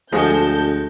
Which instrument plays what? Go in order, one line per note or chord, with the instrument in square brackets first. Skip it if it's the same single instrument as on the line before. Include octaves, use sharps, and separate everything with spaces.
[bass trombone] D2 [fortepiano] F3 G#4 D#5 [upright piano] G#3 F#4 [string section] A4 G6